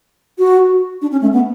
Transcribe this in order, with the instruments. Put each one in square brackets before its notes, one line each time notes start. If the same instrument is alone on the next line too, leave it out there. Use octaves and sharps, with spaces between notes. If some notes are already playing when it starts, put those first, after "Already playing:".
[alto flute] F#4
D4
C#4
A3
B3